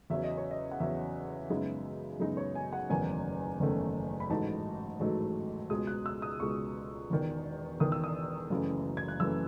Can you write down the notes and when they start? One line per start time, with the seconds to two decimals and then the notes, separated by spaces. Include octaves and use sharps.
0.10 E2 C#3 F#3 C#4 E5
0.24 D#5
0.37 C#5
0.51 D#5
0.71 F#5
0.80 E2 C#3 F#3 C#4 E5
1.50 F#2 C#3 G#3 B3 D#4
2.20 F#2 C#3 G#3 B3 D#4
2.37 C#5
2.55 G#5
2.73 F#5
2.90 F#1 E2 D#3 A3 C#4 G#5
3.60 F#1 E2 D#3 A3 C#4
4.20 B5
4.30 A1 G#2 F#3 A3 D#4 A5
5.00 A1 G#2 F#3 A3 D#4
5.70 C#2 B2 G#3 D#6
5.87 F#6
6.06 E6
6.22 D#6
6.40 C#2 B2 G#3 C#6
7.10 E1 E2 D#3
7.80 E1 E2 D#3 D#6
7.92 E6
8.04 D#6
8.50 F#1 F#2 C#3 E3 A3
8.97 G#6
9.08 F#6
9.20 F#1 F#2 C#3 E3 A3 E6